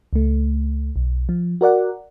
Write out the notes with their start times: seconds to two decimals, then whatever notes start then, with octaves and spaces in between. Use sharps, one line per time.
0.13 C#2 A3
0.96 B1
1.29 F3
1.61 F#4 A#4 D5 F#5